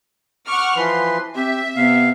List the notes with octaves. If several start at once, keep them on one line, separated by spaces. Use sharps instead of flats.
F#5 C#6 D6 F6
E3 F3 B4 C6
C4 G4 E5
C3 B3 F5